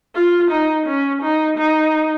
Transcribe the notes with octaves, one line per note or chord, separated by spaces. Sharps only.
F4
D#4
C#4
D#4
D#4